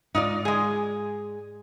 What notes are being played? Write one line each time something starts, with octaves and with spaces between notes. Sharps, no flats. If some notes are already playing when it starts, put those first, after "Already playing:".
G#2 D#4 F4 D5
G#3 G#4